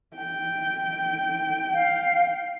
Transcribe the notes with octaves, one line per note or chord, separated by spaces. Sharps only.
G5
F5